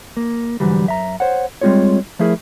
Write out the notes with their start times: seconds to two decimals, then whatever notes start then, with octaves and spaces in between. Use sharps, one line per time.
0.17 A#3
0.60 G#2 D3 E3 F#3 G3
0.86 F#2 E5 A#5
1.20 C5 C#5 F#5
1.61 G3 G#3 C4 F4 G#4 C#5
2.19 F3 A3 E4 G#4 A#4